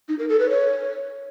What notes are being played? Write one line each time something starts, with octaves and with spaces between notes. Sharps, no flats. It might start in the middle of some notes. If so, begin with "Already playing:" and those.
D#4
A#4
A4
B4
C#5